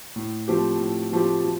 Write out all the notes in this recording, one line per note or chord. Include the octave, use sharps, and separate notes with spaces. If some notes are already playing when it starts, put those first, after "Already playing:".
A2
F3 A3 C4 G4
A2
F3 A3 C4 G4
F3